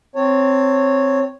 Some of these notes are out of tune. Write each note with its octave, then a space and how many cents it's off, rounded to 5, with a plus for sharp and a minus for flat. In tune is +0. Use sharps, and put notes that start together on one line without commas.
C4 +0 C#5 +0 A5 +35